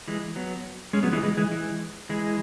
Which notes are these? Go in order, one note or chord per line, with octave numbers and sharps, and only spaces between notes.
E3 G#3
F#3 B3
G#3 C#4
F#3 B3
E3 G#3
E3 G#3
E3 G#3
E3 G#3
E3 G#3